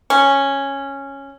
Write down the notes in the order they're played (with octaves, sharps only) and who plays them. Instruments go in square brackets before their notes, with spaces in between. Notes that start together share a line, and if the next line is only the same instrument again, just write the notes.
[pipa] C#4